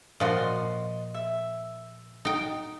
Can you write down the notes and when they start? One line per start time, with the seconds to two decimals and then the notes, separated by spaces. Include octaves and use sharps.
0.20 A#2 F3 F#4 D#5 C6
1.14 E5
2.25 D#4 G5